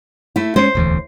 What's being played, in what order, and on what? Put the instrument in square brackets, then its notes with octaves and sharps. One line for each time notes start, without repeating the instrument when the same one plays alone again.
[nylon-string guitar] A3 E4
[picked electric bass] G#3 B3 C#4 [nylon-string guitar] C5
[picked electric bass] E1 D2 E3